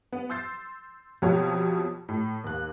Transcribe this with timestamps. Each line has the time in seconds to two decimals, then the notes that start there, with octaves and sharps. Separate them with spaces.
0.13 B3
0.29 C6 E6 G6 A6 C7
1.22 F2 B2 F3 F#3 G4 C#5
2.09 A2
2.44 D#2 F#6